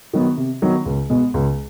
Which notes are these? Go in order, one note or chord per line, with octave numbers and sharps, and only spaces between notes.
D#3 F#3 B3
C3
D#3 F#3 B3
C#2
B2 G#3 B3
C#2